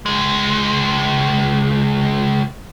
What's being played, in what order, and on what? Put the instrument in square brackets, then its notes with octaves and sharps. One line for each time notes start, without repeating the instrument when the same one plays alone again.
[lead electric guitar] C#2 G#3